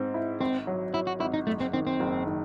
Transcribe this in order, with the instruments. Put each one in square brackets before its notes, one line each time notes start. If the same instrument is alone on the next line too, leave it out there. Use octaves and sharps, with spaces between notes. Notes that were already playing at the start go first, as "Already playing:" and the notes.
Already playing: [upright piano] G#2 C4
E4
[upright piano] G#1 [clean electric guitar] C4
[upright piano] F#3
[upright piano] F#3 [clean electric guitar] E4
[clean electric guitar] F#4
[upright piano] G#1 [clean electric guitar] E4
[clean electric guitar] D#4
[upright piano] F#1 [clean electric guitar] A3
[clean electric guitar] C4
[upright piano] D#3 [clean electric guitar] C4
[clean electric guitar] C4
[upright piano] F#1
D#3